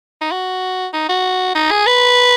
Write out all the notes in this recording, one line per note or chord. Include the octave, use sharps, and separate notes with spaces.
D#4
F#4
D#4
F#4
D#4
G#4
B4